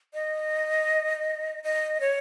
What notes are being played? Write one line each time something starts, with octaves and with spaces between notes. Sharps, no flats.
D#5
D#5
C#5